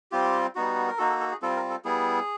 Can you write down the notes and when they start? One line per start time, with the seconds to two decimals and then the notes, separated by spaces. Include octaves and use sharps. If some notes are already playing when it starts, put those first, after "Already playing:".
0.12 G3 C4 F4 G4
0.55 G3 B3 D#4 F#4
0.88 A#4
0.98 A#3 D#4 F#4 A4
1.09 A4
1.20 A4
1.31 G#4
1.42 G3 C4 F4 A4
1.56 A#4
1.70 A4
1.85 G3 B3 E4 G#4